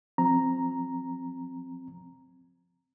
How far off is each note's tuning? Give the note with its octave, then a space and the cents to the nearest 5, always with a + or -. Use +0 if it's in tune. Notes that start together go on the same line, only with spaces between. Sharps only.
F3 +20 C4 +0 A#5 +0